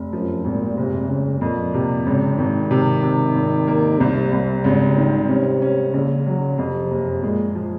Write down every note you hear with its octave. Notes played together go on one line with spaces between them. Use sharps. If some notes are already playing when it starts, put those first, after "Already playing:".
Already playing: F1
F#2 F3
G#1 A#2
F#1 C3
F#1 C#3
F2 A#2
C3
G#1 C#3
G#1 D#3
C3
C3
G#1
A#3
C2 C3
C2
G#1 C#3
D#3
C3 C#4
C#4
A#1 C#3
F#3
F2 C3
F#1
A#2 G#3
F3